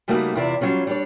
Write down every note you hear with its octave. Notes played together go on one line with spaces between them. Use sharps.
C#3 G3 A3 A#3 D#4 F#4
E2 C3 E4 F4 D5
F#3 G3 C#4 F4
G3 D4 C#5